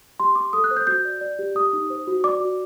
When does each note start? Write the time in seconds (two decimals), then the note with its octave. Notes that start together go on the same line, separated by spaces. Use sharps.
0.20 G4 C6
0.35 G4 D6
0.53 A4 D#6
0.64 F#6
0.71 C5
0.76 G6
0.87 F#4 G6
1.05 D5
1.21 D5
1.39 G4
1.55 G4 D#6
1.73 D#4
1.90 C5
2.07 F#4
2.24 D5 D6
2.40 F#4